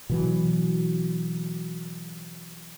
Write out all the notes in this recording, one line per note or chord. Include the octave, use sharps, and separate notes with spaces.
B2 E3 F#3